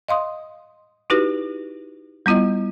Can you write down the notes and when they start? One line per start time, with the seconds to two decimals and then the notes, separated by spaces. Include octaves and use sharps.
0.08 D#5 F5 C6 D#6
1.10 D#4 E4 F#4 G4 B4
2.26 G3 B3 E4 F4 D#5